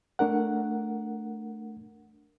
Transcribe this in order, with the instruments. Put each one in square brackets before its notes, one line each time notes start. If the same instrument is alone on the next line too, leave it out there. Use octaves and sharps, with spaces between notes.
[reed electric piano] A3 D4 A#4 F#5